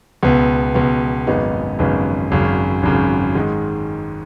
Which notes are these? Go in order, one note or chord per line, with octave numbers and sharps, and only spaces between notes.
C#2 B2 B3
C#2 B2 B3
G#1 F#2 C#3 B3 D#4
G#1 F#2 C#3 B3 D#4
G#1 F#2 C#3
G#1 F#2 C#3
G#2 D#3 G#3 D#4